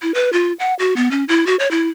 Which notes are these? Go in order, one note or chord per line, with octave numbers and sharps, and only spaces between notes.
E4
B4
F4
F#5
F#4
B3
C#4
E4
F#4
C#5
E4